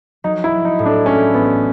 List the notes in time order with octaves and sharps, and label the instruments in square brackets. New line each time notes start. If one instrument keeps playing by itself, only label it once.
[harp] F#3 [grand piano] D#4
[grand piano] E4
[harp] F#3
[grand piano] D#4
[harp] A2
[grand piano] D4
[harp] A3 [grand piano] C#4
[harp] A1 [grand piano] B3